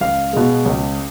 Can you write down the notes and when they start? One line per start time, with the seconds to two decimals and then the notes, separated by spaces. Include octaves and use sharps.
0.01 C#2 F5
0.33 B2 G#3
0.65 C#2